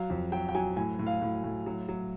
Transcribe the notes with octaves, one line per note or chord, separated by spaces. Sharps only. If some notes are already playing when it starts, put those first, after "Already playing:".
Already playing: F#3 F5
F2
F#3 G5
G5
F#3 G#5
A2 G#5
A2
F5
A2
A2
F#3
F#3